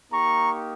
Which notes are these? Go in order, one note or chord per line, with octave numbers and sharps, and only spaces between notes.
A#3 D#4 G4 A#5 C#6